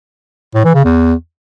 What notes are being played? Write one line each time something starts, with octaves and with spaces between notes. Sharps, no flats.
A2
E3
C#3
E2